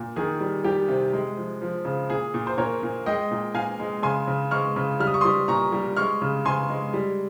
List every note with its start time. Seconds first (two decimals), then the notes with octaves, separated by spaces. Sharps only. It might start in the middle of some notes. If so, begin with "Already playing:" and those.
Already playing: A#2
0.16 D#3 G#4
0.40 G3
0.64 G3 G4
0.88 C3
1.13 G#3
1.37 F3
1.62 F3
1.85 C#3
2.10 A#2 G#4
2.34 A#2
2.47 C5
2.58 A#2 A#4 C#5
2.83 A#2
3.06 G#3 D#5 G5
3.31 A#2
3.54 A#2 F5 G#5
3.80 G#3
4.03 C#3 G#5 C6
4.27 C#3
4.51 G#3 C#6 F6
4.76 C#3
5.00 G3 F6
5.07 D#6
5.14 C#6
5.21 C6 D#6
5.25 G3
5.48 A#2 A#5 C#6
5.72 G3
5.97 G#3 C#6 F6
6.21 C#3
6.45 C#3 G#5 C6
6.69 G#3
6.93 G3